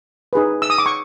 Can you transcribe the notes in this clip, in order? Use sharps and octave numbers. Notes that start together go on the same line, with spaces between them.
D#4 G#4 B4
E6
D#6
D6
C#6